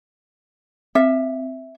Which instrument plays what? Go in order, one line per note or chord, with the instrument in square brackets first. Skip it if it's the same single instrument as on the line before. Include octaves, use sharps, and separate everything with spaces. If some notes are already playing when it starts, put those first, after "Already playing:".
[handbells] C4 [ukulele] E5